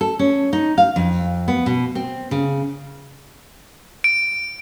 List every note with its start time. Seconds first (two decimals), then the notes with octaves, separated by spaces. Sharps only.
0.01 A4
0.19 C#4
0.53 D#4
0.78 F5
0.96 F2
1.48 B3
1.66 B2
1.95 C4
2.31 C#3
4.04 D7